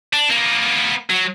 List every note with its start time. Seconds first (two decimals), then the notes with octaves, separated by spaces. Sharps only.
0.13 D4
0.30 A#3 B3
1.10 F#3